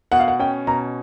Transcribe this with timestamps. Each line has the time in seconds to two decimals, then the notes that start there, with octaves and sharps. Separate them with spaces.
0.12 B2 F#5
0.20 F5
0.28 F#5
0.39 C#4 G5
0.67 B2 A#5